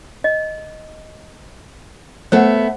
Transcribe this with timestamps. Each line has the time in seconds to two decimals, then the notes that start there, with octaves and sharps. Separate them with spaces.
0.24 D#5
2.32 A3 B3 C5 E5 F#5